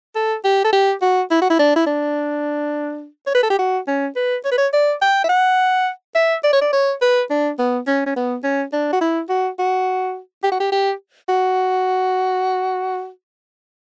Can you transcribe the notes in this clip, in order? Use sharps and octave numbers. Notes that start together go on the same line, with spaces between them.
A4
G4
A4
G4
F#4
E4
F#4
E4
D4
E4
D4
C#5
B4
A4
G4
F#4
C#4
B4
C#5
B4
C#5
D5
G5
E5
F#5
E5
D5
C#5
D5
C#5
B4
D4
B3
C#4
C#4
B3
C#4
D4
F#4
E4
F#4
F#4
G4
F#4
G4
G4
F#4